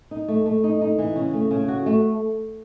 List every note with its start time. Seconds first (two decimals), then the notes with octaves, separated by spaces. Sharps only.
0.11 D#4
0.28 A3
0.46 A3
0.64 D#4
0.81 D#4
0.98 E3
1.16 C#3
1.34 A3
1.51 C#3
1.68 F#4
1.86 A3